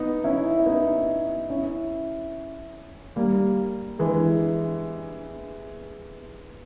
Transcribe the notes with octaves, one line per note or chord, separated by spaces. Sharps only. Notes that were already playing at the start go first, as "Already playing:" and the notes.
Already playing: B3 D#4
C#4 E4
E4
B3 D#4
C#4 E4
G3 A#3
E3 G#3